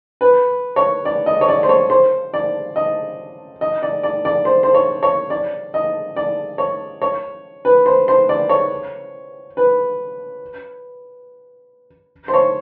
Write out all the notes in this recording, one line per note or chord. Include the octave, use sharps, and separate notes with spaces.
B4
C#5
D5
D#5
C#5
D5
C5
C#5
C5
D5
D#5
D#5
D5
D5
D5
C5
C5
C#5
C#5
D5
D#5
D5
C#5
C#5
B4
C5
C5
D5
C#5
B4
C5
C#5